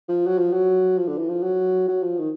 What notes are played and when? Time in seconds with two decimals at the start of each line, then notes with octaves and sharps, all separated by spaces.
0.08 F3
0.27 F#3
0.38 F3
0.53 F#3
0.98 F3
1.08 D3
1.18 E3
1.28 F3
1.43 F#3
1.88 F#3
2.03 F3
2.18 D#3